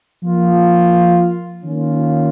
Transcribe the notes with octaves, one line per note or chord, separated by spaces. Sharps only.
F3 A#3 F4
D#3 A#3 C#4 F4